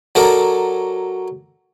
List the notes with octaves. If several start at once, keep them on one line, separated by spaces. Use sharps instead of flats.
F#3 A4 A#4 D5